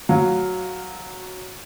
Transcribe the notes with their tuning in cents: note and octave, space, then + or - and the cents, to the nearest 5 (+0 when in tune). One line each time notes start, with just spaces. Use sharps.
F#3 +0 F5 +10